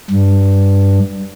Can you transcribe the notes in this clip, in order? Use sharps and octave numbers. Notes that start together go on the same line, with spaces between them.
G2